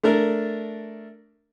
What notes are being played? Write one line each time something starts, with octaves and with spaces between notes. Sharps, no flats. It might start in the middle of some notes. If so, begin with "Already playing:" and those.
A3 D4 A#4